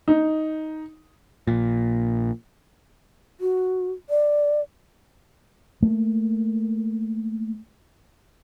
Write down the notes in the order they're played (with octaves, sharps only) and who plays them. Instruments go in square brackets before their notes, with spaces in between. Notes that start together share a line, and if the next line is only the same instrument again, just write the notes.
[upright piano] D#4
[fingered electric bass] A#1 A#2
[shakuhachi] F#4
D5
[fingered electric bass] A3 A#3